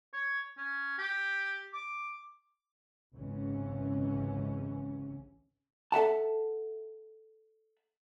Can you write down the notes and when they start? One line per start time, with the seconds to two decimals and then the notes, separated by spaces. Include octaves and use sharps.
0.13 C#5
0.57 C#4
0.99 G4
1.73 D6
3.15 G#1 C#2 G#2 C3 E3 C#4
5.92 A4 E5 F#5 A5